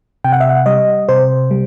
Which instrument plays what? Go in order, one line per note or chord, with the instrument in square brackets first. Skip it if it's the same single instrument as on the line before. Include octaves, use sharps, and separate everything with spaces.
[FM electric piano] C3 G5
F#5
E5
F#5
G3 D#5
C3 C5
G3